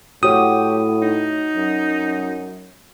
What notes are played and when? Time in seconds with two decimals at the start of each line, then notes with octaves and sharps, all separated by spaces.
0.23 A2 F#4 G4 C#5 D#6
1.02 D#4
1.56 F#2